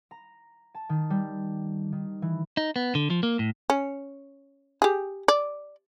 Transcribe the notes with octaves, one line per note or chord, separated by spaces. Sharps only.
A#5
A5
D#3
G3
D#3
E3
D#4
B3
D3
F3
A#3
A2
C#4
G4 G#4
D5